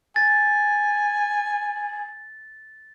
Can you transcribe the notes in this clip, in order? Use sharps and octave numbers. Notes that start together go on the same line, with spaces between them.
G#5 A6